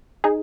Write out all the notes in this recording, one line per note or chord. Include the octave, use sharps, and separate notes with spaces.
D#4 G#4